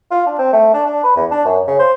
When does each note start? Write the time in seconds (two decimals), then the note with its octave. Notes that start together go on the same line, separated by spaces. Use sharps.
0.11 F4
0.26 D4
0.39 C4
0.53 A3
0.74 D4
0.86 D4
1.04 B4
1.16 E2
1.31 D4
1.45 F#2
1.67 C#3
1.79 C5